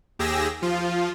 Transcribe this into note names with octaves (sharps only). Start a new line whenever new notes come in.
D#2 G4 G#4 E6 A#6
F3 F4